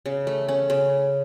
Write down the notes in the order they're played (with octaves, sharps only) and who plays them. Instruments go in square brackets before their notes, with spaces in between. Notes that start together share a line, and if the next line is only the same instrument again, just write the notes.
[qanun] C#3
A3
C#4
C#3